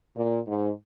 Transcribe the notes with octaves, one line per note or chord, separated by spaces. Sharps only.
A#2
G#2